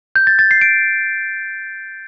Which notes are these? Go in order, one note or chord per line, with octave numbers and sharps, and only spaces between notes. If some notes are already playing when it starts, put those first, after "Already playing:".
G6
A6
A6
C7
D7